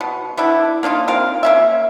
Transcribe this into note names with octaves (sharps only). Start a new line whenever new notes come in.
B2
B3 D4 E4
A#3 D4 D#4 F4
C4 F4 A#4 F5
A#3 C#4 E5